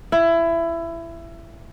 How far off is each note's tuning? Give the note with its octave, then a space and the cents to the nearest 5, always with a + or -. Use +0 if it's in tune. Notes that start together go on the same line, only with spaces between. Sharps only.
E4 +20